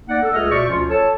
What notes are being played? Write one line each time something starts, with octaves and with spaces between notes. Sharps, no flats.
A#3 D#4 D5 F#5
A4
C#2 A3 G#4 D#5 E5 F6
B2 C5 D5 E5 C#6
D2 F3 C#4 F4
A4 C#5 A5